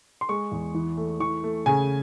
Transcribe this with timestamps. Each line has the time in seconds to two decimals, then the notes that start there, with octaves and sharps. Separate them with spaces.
0.21 C6
0.29 G#3 C#6
0.52 E2
0.74 E3
0.97 A3
1.20 E3 C#6
1.43 A3
1.66 C#3 G#5